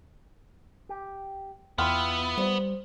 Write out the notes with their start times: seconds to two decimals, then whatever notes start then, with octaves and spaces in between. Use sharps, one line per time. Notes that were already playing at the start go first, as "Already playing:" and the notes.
0.89 G4
1.78 E2 B3 E4 F4 G5 C6 F6
2.38 G3 C5